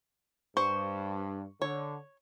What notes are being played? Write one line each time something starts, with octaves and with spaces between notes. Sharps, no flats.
G2 C5 C#6
D3 C#5